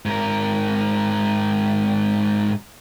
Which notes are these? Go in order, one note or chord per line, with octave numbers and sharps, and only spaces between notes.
G#2 A#4